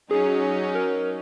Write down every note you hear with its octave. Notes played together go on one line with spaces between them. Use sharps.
F#3 C#4 D#4 G#4
A#4